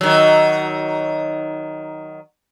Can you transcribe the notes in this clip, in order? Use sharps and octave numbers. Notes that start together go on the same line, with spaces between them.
D#3 F#3